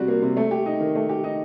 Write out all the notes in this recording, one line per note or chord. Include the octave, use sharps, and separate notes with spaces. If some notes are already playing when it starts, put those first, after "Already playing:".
Already playing: C3 G3 F#4
A#3
C3
A3
G4
D#4
D#3
A3
G4
D#4